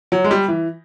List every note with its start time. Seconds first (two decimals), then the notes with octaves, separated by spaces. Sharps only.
0.12 F#3
0.24 G#3
0.31 G3
0.48 E3